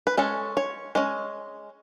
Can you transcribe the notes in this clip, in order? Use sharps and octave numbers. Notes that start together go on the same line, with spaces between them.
B4
G#3 C#4 A4
C#5
G#3 C#4 D#5